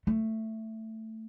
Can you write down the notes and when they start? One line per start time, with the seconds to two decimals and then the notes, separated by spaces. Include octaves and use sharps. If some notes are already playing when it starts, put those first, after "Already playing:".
0.07 A3